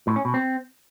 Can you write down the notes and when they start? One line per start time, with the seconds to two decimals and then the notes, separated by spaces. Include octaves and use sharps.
0.07 A2
0.16 C#4
0.25 B2
0.34 C4